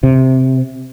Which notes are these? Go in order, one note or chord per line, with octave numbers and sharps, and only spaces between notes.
C3